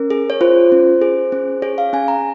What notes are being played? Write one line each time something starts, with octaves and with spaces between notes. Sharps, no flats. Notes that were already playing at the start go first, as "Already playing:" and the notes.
Already playing: C#4 A#4
G#4
C#5
F4 C5
C#4
G#4
C#4
G#4 C#5
F5
C#4 G#5
A#5